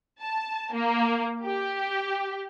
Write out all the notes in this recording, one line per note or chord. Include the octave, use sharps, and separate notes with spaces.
A5
A#3
G4